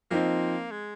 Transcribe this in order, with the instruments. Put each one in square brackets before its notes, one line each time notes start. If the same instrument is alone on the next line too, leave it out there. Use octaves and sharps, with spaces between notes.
[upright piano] F3 C4 D#4 [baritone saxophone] A#3
[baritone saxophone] G#3